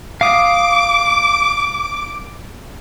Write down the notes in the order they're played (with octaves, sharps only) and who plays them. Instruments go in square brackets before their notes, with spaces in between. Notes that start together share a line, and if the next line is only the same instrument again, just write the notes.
[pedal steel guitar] F5 D#6 [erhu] D6